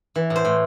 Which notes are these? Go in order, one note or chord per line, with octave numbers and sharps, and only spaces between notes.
E3
A2
C5
A2